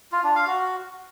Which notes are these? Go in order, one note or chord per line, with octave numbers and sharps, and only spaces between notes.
F4
D4
F5
F#4